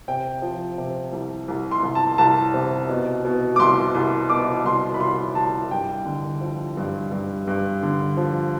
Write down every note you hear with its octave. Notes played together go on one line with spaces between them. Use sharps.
C3 G5
F3
C3
C2
C2
C6
C2
A5
C2 A5
C3
B2
B2
D6
C2 C6
C2
B2 D6
C2 C6
B5
C2 C6
C2 A5
G2 G5
D3
F3
G2
G2
G2
D3
F3